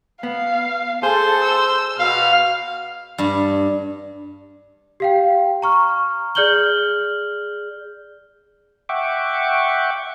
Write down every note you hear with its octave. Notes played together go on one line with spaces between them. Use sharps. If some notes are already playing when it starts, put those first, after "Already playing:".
B3 F5
G#4 A4 C5
E6
B2 F5 F6
G2
G4 F5 G5
A#5 C#6 F6
G#4 D5 F6 G6 F#7 G7
E5 F#5 G5 C#6 D6